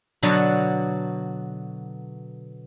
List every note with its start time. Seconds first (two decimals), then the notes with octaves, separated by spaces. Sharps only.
0.23 B2 D3 F#3 B3